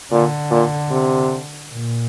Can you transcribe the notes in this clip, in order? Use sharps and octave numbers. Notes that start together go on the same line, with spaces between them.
A#2 D3
A#2
C3
A#2